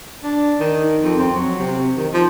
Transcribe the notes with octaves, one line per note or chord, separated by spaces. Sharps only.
D4
D#3
F2
C4
F#3
C3
D#3
F3